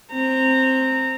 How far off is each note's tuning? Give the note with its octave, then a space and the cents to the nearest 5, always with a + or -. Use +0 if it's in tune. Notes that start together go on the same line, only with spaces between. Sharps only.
C4 +5 A#5 -20